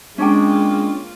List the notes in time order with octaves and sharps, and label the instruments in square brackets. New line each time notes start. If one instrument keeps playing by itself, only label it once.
[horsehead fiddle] G#3 [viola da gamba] A#3 F4 [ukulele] C#4 D4 G5